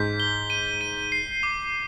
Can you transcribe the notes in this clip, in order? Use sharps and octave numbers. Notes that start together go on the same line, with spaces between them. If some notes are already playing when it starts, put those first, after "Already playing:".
Already playing: G#2 G6 B6
G7
D#7
D#7
C7
D6